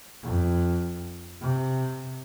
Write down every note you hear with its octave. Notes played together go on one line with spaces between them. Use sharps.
F2
C3